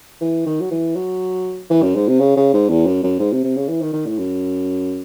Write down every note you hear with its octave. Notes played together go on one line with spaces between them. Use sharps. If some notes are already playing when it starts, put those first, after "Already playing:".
E3
D#3
F#3
E3
F#3
E3
F#2
G#2
C3
C#3
C#3
G#2
E2
F#2
F#2
G#2
C3
C3
C#3
E3
D#3
D#3
A2
F#2